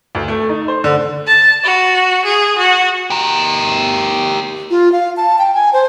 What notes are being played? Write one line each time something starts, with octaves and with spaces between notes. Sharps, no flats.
D2
A3
D#4
C5
D3
A5
F#4
G#4
F#4
G4 A#4
F4
F5
A5
G5
G#5
C5